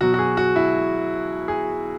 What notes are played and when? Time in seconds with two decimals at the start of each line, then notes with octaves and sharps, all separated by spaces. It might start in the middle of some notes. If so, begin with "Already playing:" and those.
0.01 B2 F#3 F#4
0.14 F#4
0.19 G#4
0.37 F#4
0.56 E4
1.48 G#4